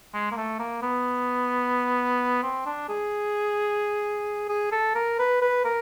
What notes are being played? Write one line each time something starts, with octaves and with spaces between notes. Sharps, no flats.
G#3
A#3
A3
A#3
B3
C4
D4
G#4
G#4
A4
A#4
B4
B4
A#4